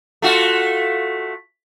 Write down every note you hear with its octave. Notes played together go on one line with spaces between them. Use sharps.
A3 F4 F#4